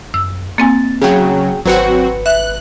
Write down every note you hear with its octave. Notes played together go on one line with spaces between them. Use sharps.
F#2 E6
A#3 C4 G#5 A6
C#3 F#3 G#4 G5
G#1 F#3 C4 F#4 B4 C#7
E5 F#6